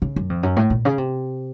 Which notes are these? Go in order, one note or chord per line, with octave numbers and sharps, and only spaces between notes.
C#3
F#2
F2
F#2
A2
A#2
C#3
C3